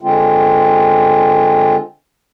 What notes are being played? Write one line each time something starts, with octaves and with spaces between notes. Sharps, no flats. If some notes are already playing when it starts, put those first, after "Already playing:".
D3 G#3 C4 F4